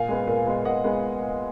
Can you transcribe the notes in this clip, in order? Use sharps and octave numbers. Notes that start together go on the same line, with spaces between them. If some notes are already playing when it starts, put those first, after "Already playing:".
Already playing: A#2 F5 G#5
G#3 B3
A#2
G#3 B3
A#2 D#5 F#5
G#3 B3